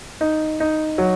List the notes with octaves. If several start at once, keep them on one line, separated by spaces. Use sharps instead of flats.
D#4
D#4
F#3